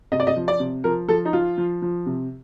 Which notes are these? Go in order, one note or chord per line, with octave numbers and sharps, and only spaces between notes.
C3 D#5
D5
D#5
F3
D5
C3
F3 A#4
F3 A4
D#4
F3 F4
F3
F3
C3